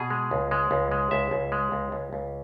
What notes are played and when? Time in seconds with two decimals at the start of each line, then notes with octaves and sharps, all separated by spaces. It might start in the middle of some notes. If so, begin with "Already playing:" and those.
Already playing: B2 G#4
0.10 G#3
0.31 C#2
0.51 G#3
0.71 C#2
0.92 G#3
1.11 C#2 E5
1.31 C#2
1.52 G#3
1.72 C#2
1.92 C#2
2.13 C#2